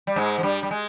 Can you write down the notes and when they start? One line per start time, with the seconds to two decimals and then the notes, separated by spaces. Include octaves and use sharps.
0.07 G3
0.16 G#2 G#3
0.38 F3
0.43 G2 G3
0.63 G3
0.71 G#3